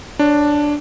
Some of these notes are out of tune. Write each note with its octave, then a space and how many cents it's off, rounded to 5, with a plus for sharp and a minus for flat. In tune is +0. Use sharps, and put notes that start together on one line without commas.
D4 +0 C#5 +15